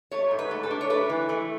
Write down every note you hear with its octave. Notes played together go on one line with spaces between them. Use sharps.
A3 C#5
G#2
B4
A3
A4
D4
C#5
A3 B4
E3
A3